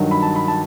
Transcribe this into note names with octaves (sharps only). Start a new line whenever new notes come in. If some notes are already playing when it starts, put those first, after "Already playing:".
Already playing: G2 D#3 F#3
B5
A5
B5
A5